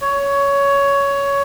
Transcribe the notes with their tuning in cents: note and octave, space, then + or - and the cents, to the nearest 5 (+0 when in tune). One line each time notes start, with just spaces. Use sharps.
C#5 +15